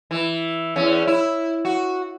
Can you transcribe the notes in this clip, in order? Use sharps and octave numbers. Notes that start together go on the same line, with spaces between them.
E3
E2 C#4
E4
F#4